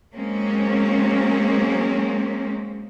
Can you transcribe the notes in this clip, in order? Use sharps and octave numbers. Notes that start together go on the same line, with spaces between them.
F#3 G#3 A#3 C4 C#4